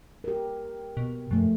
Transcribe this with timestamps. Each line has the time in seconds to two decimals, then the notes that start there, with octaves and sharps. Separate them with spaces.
0.24 G4 A#4
0.97 B2
1.31 F#2 F3 A3